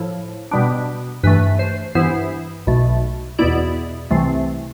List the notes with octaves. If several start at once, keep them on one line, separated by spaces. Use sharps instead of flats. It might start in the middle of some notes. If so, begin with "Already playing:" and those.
Already playing: A2 F3 E4
B2 G3 B3 D4
G2 E3 A3 B4
C5
G2 E3 B3 E4 C5
B1 B2 A3
E2 B2 B3 E4 D5
C2 C3 E3 A3 C4